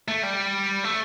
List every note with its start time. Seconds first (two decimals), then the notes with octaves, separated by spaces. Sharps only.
0.08 A3
0.23 G3
0.84 A3